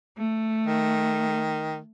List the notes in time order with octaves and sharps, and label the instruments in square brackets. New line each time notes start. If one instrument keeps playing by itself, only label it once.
[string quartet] A3
[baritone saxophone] D#3